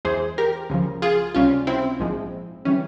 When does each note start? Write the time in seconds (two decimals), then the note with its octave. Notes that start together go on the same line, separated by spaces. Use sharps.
0.05 E2 E3 G#3 G#4 C5
0.38 G4 A#4
0.70 C#2 C#3 F3
1.02 F4 G#4
1.35 C#2 C3 G3 C#4 F4
1.67 C4 E4
2.00 A#1 G#2 F3 G#3
2.65 E3 G3 C#4